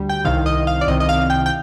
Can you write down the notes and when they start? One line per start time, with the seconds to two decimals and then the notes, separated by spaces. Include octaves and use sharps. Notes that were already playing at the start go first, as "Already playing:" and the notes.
Already playing: D2 G3
0.09 G5
0.25 C2 C3 D#3 F5
0.46 D#5
0.67 F5
0.81 D5
0.88 C2 C3 D#3 D#5
1.00 D#5
1.09 F5
1.30 G5
1.46 G5